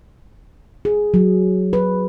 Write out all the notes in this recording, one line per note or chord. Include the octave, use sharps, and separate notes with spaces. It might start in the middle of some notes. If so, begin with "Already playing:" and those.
G#4
F#3
B4